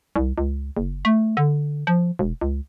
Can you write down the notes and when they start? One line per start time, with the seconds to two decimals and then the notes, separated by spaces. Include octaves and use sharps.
0.16 C2
0.38 C#2
0.77 F#1
1.05 A3
1.37 D3
1.87 F3
2.19 E1
2.41 C#2